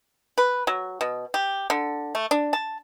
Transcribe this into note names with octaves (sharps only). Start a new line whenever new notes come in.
B4
F#3
B2
G4
D3
A3
D4
A5